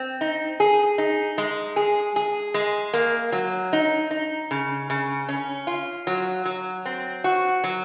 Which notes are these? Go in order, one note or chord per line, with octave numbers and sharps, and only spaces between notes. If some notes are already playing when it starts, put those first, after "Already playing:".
Already playing: C4
D#4
G#4
D#4
G#3
G#4
G#4
G#3
A#3
F#3
D#4
D#4
C#3
C#3
C#4
F4
F#3
F#3
C4
F#4
F#3